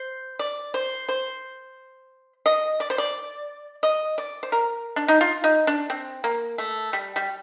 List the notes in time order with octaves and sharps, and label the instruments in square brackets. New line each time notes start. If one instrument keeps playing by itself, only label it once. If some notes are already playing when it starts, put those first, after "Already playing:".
Already playing: [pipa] C5
D5
C5
C5
D#5
D5
C5
D5
D#5
D5
C5
A#4
D4
D#4
F4
D#4
D4
C4
A#3
A3
G3
G3